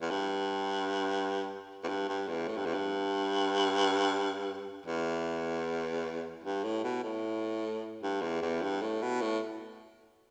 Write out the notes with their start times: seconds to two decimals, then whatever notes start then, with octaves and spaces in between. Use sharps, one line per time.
0.01 E2
0.11 G2
1.83 E2
1.89 G2
2.09 G2
2.28 E2
2.48 A2
2.57 G2
2.66 E2
2.74 G2
4.86 E2
6.44 G2
6.64 A2
6.84 B2
7.03 A2
8.03 G2
8.22 E2
8.42 E2
8.62 G2
8.82 A2
9.02 B2
9.21 A2